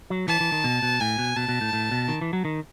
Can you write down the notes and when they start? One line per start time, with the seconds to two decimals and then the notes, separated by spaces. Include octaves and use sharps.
0.10 F#3
0.28 E3 A5
0.40 E3
0.52 D#3
0.64 B2
0.82 B2
1.00 A2 G#5
1.18 B2
1.36 B2 A5
1.48 B2
1.61 A2
1.73 A2
1.91 B2
2.08 D#3
2.21 E3
2.33 F#3
2.45 D#3